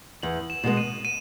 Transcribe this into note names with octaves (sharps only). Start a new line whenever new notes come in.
E2 F#7
E7
B2 G#3 B3
D#7
D#7